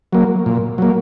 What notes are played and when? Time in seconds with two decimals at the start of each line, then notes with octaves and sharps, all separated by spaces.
0.13 F#3 A#3
0.46 A#2
0.78 F#3 A#3